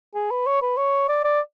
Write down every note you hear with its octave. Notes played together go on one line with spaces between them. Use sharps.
G#4
B4
C#5
B4
C#5
D5
D5